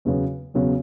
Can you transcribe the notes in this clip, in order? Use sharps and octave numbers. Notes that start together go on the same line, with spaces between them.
E2 C#3 F#3 B3
E2 C#3 F#3 B3